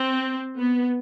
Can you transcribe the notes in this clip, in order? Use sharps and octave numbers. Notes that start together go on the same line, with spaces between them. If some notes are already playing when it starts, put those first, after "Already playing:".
Already playing: C4
B3